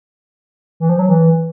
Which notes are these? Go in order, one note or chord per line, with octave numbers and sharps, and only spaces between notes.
E3
F3
F#3
E3